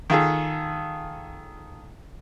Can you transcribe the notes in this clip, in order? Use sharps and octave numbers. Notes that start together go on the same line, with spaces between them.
D#3 F4 G#4 A4